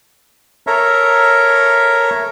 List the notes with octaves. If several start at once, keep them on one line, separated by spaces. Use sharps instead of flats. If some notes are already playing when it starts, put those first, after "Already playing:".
A4 A#4 C#5 E5 A#5